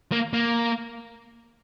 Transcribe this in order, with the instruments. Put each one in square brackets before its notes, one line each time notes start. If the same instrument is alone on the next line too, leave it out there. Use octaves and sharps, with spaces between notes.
[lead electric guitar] A#3
A#3